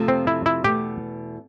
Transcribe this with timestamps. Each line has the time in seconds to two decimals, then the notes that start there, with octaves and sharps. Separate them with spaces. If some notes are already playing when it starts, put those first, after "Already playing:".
Already playing: F2 C3 F3 A3
0.08 C4
0.27 E4
0.46 E4
0.64 E2 B2 A3 G4